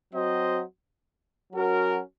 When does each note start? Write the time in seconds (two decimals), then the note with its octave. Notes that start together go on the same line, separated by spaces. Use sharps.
0.14 F#3 C4 F#4 C5 D#5
1.53 F#3 C#4 F#4 A#4